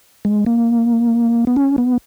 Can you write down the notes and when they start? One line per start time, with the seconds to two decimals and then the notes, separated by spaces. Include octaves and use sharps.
0.25 G#3
0.46 A#3
1.47 B3
1.56 C#4
1.78 B3